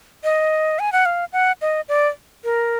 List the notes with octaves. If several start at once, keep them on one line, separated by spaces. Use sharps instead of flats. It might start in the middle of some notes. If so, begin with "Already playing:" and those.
D#5
G#5
F#5
F5
F#5
D#5
D5
A#4